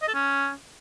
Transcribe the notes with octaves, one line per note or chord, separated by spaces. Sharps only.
D#5
A4
C#4